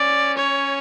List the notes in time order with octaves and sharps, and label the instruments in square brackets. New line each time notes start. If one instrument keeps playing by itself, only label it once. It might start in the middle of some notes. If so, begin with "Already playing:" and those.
Already playing: [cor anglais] C#4 [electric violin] D5
[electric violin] C#5